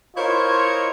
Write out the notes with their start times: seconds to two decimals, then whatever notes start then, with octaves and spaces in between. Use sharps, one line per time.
0.16 E4 F4 A#4 C5 C#5 D#5